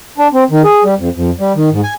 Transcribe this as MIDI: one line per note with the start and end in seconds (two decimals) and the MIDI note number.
0.18 0.28 62
0.33 0.44 60
0.50 0.62 51
0.64 0.83 68
0.84 0.94 55
0.99 1.09 41
1.15 1.30 41
1.40 1.53 55
1.55 1.69 51
1.72 1.81 44
1.83 1.94 80